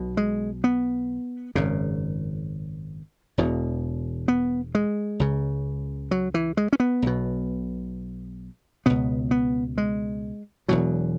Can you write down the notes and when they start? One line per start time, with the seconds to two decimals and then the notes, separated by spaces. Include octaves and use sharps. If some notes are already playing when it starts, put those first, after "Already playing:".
Already playing: B1 B2
0.17 G#3
0.64 B3
1.55 G#1 F#2 C#3
3.38 E1 E2 B2
4.28 B3
4.75 G#3
5.20 C#2 C#3
6.11 F#3
6.34 E3
6.57 G#3
6.73 C#4
6.80 B3
7.02 B1 B2
8.86 C#2 B2 B3
9.31 B3
9.78 G#3
10.68 E1 E2 B2 F#3